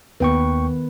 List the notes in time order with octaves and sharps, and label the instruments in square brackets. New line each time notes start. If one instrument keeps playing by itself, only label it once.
[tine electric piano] D#2 G5 C#6 [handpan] D#3 B3 B4